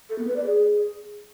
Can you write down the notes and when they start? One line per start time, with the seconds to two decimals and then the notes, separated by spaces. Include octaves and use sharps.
0.10 A4
0.18 B3
0.27 B4
0.36 D5
0.45 G#4